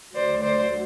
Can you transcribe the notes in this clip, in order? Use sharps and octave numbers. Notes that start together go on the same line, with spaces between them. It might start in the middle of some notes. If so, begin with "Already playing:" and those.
D2 D3 F#3 C5 D5
C5 D5